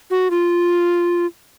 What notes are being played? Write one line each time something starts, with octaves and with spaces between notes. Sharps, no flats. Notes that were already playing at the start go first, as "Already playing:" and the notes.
F#4
F4